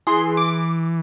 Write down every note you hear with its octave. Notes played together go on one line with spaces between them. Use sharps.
E3 G#4 C6
D6